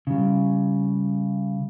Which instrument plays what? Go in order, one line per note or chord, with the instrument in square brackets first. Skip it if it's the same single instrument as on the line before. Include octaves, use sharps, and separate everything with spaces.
[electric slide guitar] C#3 G3